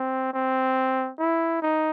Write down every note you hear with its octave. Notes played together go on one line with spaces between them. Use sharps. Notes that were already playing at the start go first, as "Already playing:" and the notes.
Already playing: C4
C4
E4
D#4